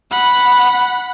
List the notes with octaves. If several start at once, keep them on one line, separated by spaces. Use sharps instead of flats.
F#5 B5